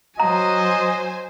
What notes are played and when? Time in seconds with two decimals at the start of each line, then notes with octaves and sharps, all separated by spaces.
0.20 F#3 C5 D#5 G#5 A#5